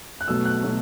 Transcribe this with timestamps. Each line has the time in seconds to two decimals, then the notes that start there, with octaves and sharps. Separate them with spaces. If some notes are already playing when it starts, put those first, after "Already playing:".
0.21 F#6
0.28 B2 F#3 A3 E6
0.45 F#6
0.63 B2 F#3 A3